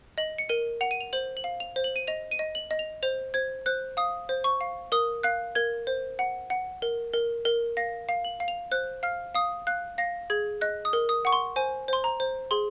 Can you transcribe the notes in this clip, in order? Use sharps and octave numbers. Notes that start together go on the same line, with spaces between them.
D#5 F#7
C#7
A#4 D#7
F#5 F7
D#7
F7
C5 F#7
F#7
F5
F7
C5
F#7
D#7
D#5 F7
D#7
D#5
F#7
D#5
F7
C5 F7
C5 G#6
C5 F#6
F5 D#6
C5
C#6
F5
A#4 D#6
F5 F#6
A#4 G#6
C5
F#5
F#5
A#4
A#4
A#4
F5 A#6
F5
F#7
F5
F7
C5 F#6
F5 F6
F5 D#6
F5 F#6
F5 A#6
G#4 G#6
D#5 F#6
D#6
A#4
D#6
F#5 C#6
C6
C5 G#5
C5 C6
A#5
C5
G#4 C6